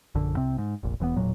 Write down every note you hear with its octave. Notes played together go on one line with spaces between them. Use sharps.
A#1 F#2 D3
C2 C3 C4
G#2
F1 A#1
E1 E3 F3 B3
E1 A#2 F#3